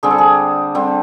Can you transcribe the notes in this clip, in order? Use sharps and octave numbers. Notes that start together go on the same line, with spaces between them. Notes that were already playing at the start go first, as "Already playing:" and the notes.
D3 G3 C4 G#4
A4
G#4
D3 G3 C4